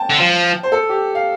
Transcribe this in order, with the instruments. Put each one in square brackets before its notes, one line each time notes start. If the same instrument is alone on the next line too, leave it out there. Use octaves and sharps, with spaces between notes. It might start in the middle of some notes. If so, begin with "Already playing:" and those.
Already playing: [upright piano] G5 A5
[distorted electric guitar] D3
F3
[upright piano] C5
A4
G4
F5